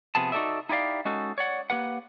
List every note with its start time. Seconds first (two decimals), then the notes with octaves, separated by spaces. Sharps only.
0.15 C3 F3 B3 G#4 A5
0.32 D#4 F#4 G4 A4 D5 E5
0.69 D#4 E4 G4 D5 F5
1.05 G#3 C#4 D#4 F#4 A4
1.38 C#5 D5 F#5
1.70 A#3 G4 B4 F#5